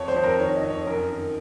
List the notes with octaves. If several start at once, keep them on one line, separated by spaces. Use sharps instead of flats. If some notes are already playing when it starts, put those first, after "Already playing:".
Already playing: F2 C#5
C5
F2
A#4
D#3 C#5
D#5
F2
C#5
F#2 A#4
D#3